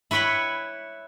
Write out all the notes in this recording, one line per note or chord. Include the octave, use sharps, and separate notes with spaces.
E4 B4 C#5 G5 B5